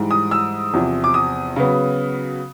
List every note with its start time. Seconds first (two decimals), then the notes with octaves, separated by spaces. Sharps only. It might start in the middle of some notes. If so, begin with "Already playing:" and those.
Already playing: G#2 E3 G3
0.11 D#6
0.31 E6
0.73 E2 C3 F3
1.04 D6
1.14 D#6
1.56 C#3 F#3 B3